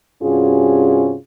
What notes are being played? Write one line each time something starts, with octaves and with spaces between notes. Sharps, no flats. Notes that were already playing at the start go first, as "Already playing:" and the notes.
G2 C3 C#4 F4 F#4 G#4